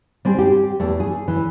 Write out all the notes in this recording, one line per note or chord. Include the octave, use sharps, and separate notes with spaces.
G3 C4 G#4
G4
E2 A3
G#4
E3